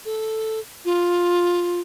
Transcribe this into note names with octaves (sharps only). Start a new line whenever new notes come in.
A4
F4